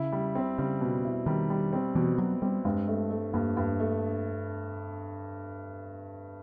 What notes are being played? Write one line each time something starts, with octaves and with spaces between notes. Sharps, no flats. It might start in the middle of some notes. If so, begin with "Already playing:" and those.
Already playing: C#3 E4
G3
C4
C#3 G3
B2
E4
D#3 G3
G3
C4
B2 E3
B2 F#3
G3 C4
G2 G#3
A3
A3
G2 A#3
G2
A3